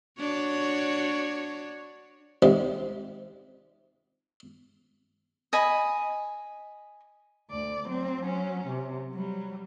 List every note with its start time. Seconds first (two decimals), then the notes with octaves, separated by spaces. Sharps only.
0.19 D4 F#4 C#5
2.42 A1 F2 G#2 C3 G3 G#3
5.53 D#5 G#5 B5
7.50 D2 D5
7.88 F#3 C4
8.23 F#3 C#4
8.68 C3
9.12 F#3 G3